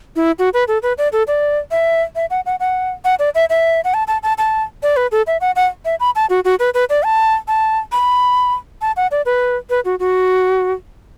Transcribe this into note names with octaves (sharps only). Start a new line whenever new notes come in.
E4
F#4
B4
A4
B4
D5
A4
D5
E5
E5
F#5
F#5
F#5
F#5
D5
E5
E5
F#5
A5
A5
A5
A5
D5
B4
A4
E5
F#5
F#5
E5
B5
A5
F#4
F#4
B4
B4
D5
A5
A5
B5
A5
F#5
D5
B4
B4
F#4
F#4